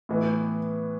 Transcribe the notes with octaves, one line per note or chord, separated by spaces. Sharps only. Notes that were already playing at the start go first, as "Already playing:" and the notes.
A2 E3 B3